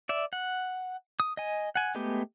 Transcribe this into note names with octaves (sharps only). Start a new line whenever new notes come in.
D5 E5
F#5
D#6
D#5 G#5
F#5 G#5
G#3 A3 B3 G4